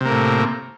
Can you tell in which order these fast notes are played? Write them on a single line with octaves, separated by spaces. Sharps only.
C3 A#3 A2